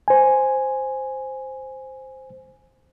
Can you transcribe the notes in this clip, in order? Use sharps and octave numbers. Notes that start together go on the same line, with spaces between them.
C5 G#5